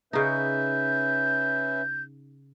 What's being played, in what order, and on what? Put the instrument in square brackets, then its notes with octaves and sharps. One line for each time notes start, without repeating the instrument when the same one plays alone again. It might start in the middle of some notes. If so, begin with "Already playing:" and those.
[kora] C#3 D#4 [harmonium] C#4 B4 E5 [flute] G6